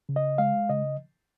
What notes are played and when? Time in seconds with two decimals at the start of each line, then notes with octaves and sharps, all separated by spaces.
0.09 C#3
0.16 D#5
0.38 G#3 F5
0.69 C#3 D#5